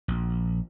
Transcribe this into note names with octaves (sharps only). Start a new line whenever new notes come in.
A#1